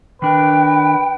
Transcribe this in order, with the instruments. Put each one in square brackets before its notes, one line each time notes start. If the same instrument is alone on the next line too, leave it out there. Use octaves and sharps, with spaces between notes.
[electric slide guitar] D#3 D4 A#4 [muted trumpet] B4 [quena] G5